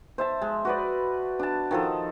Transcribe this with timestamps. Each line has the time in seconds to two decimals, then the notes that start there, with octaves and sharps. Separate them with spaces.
0.18 C5 E5 A5
0.42 G#3
0.65 F#4 B4 D5
1.39 D4 A5
1.71 D#3 F3 A4